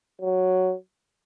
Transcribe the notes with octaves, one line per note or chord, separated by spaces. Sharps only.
F#3